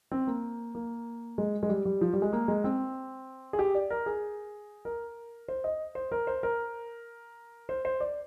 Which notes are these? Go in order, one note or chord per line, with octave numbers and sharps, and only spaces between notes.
C4
A#3
A#3
G#3
G#3
G3
G3
F3
G3
G#3
A#3
G#3
C4
G#4
G4
D5
A#4
G#4
A#4
C5
D#5
C5
A#4
C5
A#4
C5
C5
D5